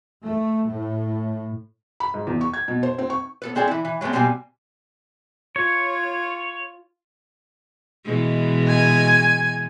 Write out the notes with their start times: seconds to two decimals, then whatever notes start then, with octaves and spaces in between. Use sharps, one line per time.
0.22 A3
0.68 A2
2.00 B5
2.14 G#2
2.27 E2
2.41 C#6
2.54 G#6
2.68 B2
2.83 C5
2.98 C4
3.10 C#6
3.42 B3 A4 B4
3.55 G#3 C4 G#4 A4 D5
3.68 E3 E4
3.85 E3
4.01 F#3 G#3 A3 B3 C4
4.13 B2 G3 A#3 C4 G#5
5.56 F4 C#5
8.05 B2 E3 G#3
8.68 G#5